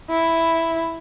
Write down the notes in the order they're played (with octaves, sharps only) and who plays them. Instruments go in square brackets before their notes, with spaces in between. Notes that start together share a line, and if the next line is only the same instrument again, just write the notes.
[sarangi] E4